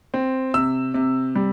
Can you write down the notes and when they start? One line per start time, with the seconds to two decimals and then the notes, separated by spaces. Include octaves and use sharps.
0.14 C4
0.54 C3 E6
0.94 C3
1.35 G3